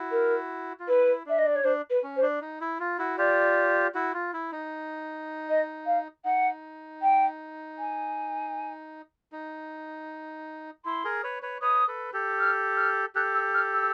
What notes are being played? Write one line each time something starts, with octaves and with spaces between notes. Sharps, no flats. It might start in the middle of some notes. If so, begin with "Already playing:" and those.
Already playing: E4 F#4
A#4
F4
E4 B4
D4 E5
D#5
D5
C#5
D4 C5
B4
C#4
C5
D4
D#4
E4
F4
E4 F#4
F4 G4 D5
E4 F#4
F4
E4
D#4
D#5
F5
D#4 F#5
G5
G#5
D#4
E4 C6
G#4 A#4
B4 C#5
B4 C#5
B4 C#5 D#6
A4 B4
G4 A4
F6
F6
G4 A4 F#6
E6
F6
E6